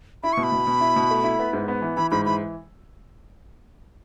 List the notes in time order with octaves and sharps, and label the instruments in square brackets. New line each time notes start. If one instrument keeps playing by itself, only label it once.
[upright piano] E4 [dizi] B5
[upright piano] B2 [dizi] C#6
[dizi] B5
[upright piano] B2
B2
E4
B2
A3
E4
B3
G#2
B3
E3
[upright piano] E3 [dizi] B5
[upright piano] G#2 [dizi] B5
[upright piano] E3 [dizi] B5